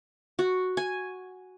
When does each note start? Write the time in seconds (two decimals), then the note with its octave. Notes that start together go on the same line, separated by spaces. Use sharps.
0.39 F#4
0.77 G#5